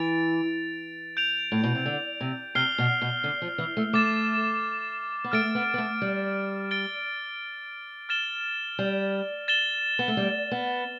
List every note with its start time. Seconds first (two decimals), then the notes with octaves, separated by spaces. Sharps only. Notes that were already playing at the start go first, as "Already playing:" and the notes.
Already playing: E3 A6 D7 F7
1.17 G6 D7 F7
1.52 A2
1.64 B2
1.75 C3
1.86 D3
2.21 C3
2.55 C3 F6 C7 G7
2.78 B2
3.02 B2
3.24 D3
3.42 F3
3.58 E3
3.77 A3
3.93 A3 D6 A6 E7
5.24 B3
5.32 A3 F6 A6 D7
5.55 B3
5.74 B3
5.78 A3
6.02 G3
6.71 A6 D7 G7
8.09 F6 A6 E7 G7
8.79 G3
9.48 A6 E7 G7
9.99 B3
10.08 A3
10.17 G3
10.52 B3